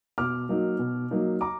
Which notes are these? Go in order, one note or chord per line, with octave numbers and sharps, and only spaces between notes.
B2 D6 F6
F#3 A#3 D#4
B2
F#3 A#3 D#4
A#5 D6